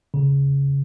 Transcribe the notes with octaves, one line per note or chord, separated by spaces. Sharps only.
C#3